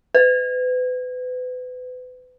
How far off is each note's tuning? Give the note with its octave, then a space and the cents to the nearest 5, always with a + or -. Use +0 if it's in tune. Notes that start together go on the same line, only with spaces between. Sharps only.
B4 +35